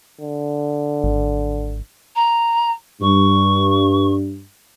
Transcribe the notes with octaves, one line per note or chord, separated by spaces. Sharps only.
D3
G#1
A#5
G2 C#6